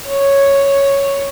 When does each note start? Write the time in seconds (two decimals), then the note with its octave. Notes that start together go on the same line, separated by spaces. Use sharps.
0.08 C#5